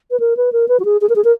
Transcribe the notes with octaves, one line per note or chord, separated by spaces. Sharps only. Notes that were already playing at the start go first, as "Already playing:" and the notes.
B4
A#4
B4
A#4
B4
F#4
G#4
G#4
A#4
G#4
A#4